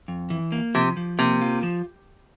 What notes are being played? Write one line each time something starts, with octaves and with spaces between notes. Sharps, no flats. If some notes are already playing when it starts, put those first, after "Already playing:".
F2
E3
A#3
C3 F3
F3
C3 A#3
F4
F3